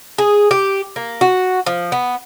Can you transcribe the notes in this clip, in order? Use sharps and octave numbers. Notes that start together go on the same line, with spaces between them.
G#4
G4
A#3
F#4
F3
B3